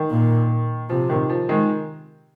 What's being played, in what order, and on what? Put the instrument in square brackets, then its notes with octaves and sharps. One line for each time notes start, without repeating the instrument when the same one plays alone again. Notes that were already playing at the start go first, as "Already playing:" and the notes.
Already playing: [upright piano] D#3
[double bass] A#2
[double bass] C3 [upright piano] F3
[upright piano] D#3
F3
D#3 G#3